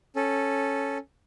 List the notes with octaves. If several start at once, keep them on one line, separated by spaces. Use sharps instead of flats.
C#4 A4